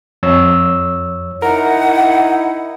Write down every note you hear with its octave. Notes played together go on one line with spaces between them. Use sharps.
F2 C#5 E6
D#4 E4 A#4 F#5